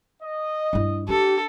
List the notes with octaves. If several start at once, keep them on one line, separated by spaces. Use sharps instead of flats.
D#5
G2 E4
D4 G4 A4